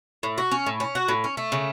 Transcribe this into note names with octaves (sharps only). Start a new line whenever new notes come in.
A2
F#4
C#4
A2
C#4
F#4
A2
C#4
A3
C#3